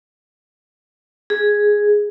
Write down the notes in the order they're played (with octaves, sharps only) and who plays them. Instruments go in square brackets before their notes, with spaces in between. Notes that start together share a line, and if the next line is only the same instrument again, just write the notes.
[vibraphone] G#4